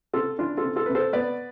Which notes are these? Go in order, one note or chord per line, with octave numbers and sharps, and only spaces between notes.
C3 F4 A4
E3 D4 F4
F4 A4
C3
F4 A4
C3 B4
A4 C5
B3 B4 D5